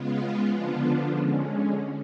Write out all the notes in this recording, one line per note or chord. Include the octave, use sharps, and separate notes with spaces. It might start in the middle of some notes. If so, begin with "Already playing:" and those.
Already playing: C#3 G#3 B3 F4
D3 F3 B3 D4 F4
D3 G#3 C#4